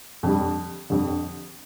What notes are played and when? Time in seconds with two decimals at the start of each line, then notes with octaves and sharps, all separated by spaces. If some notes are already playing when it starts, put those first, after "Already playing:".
0.23 F2 D3 G3
0.90 F2 D3 G3